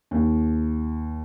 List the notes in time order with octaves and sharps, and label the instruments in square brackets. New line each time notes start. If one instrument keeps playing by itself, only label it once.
[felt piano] D#2